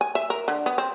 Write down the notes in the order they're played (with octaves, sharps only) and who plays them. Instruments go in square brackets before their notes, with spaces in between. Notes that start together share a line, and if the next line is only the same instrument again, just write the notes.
[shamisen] G#5
E5
A#4
D3
B3
C4